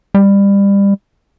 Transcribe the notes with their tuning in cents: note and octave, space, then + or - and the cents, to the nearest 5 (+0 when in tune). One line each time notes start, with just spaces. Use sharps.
G3 +25